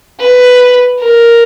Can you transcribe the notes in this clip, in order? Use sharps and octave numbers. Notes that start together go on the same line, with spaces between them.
B4
A#4